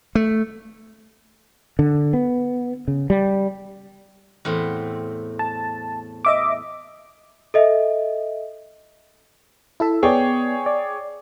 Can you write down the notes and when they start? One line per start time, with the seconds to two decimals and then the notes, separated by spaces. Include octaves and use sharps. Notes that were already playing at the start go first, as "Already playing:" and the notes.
0.15 A3
1.79 D3
2.13 B3
2.88 C#3
3.10 G3
4.45 E2 A2 C4
5.39 A5
6.25 D#5 E5 D6
7.54 A4 D#5 E5
9.80 E4 A4 E5
10.03 B3 G#4 C#5 D5 G5
10.66 D5